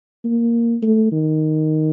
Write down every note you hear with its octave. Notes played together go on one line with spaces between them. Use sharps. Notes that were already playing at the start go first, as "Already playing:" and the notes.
A#3
A3
D#3